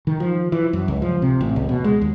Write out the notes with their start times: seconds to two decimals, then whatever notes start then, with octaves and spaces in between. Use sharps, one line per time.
0.07 D#3
0.20 F3
0.52 E3
0.73 F#2
0.88 C#2
1.02 F3
1.22 C3
1.41 A1
1.56 C#2
1.69 B2
1.84 G#3
2.01 D#2